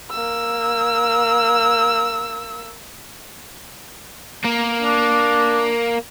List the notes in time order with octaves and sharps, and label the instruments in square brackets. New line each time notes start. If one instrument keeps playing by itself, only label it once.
[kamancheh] A#3 E6
[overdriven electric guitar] A#3
[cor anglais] D4